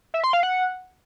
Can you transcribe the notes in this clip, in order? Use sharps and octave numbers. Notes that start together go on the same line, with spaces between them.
E5
C6
F5
F#5